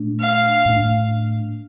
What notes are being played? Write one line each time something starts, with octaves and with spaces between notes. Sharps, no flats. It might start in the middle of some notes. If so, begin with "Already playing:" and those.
Already playing: A#2 A3 D4
F5
A2 A3 D4